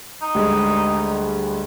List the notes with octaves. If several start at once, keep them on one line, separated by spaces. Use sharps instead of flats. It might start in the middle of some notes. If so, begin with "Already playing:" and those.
D#4
D2 G3 G#3